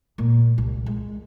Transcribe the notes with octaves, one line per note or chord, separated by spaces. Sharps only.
A#2
C2
G#3